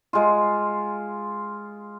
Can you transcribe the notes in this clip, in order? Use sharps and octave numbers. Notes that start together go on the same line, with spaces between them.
G#3 F4